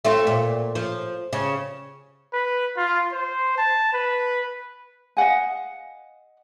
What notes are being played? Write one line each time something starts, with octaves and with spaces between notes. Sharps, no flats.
A3 C4 F4
A#2
F3
C#3
B4
F4
C5
A5
B4
D#5 F5 F#5 G#5